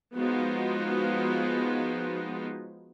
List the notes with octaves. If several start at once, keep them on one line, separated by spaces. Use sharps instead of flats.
F3 G#3 B3 D#4 F4 F#4